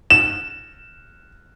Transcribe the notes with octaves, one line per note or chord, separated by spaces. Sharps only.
E7